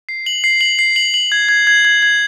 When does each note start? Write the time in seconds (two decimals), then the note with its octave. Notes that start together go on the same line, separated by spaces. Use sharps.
0.09 C7
0.26 F#7
0.44 C7
0.61 F#7
0.79 C7
0.96 F#7
1.14 F#7
1.32 G#6
1.49 G#6
1.67 G#6
1.85 G#6
2.03 G#6